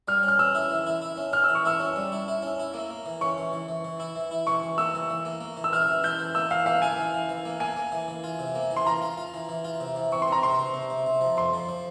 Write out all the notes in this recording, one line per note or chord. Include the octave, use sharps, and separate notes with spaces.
G3 F6
C#4
F6
C#4 E6
E4
E3
E4
E4
C#4
C#4 F6
E3 E6
C#6
E4 E6
C#4
G3
E4
E4
C#4
E4
A#3
A#3
E3
C#4 C#6
E3
E3
E3
E3
E4
E3
E4
E3 C#6
E3
A#3 E6
E3
E3
A#3
A#3
E3
E6
E4 F6
E3
E4 G6
E3
A#3 E6
E3 F5
A#3 F5
E4 G#5
E3
E3
E3
A#3
A#3 G#5
A#3
E3
E3
F4
C3
A#3
E3
C6
F4 A#5
F4
F4
E3
E3
F4
C3
E3
C4 C#6
C6
C4 A#5
C3 C6
C3
C3
C3
C3
F3
F2 C6
F3
F3